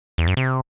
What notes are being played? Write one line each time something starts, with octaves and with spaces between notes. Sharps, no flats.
E2
F#2
C3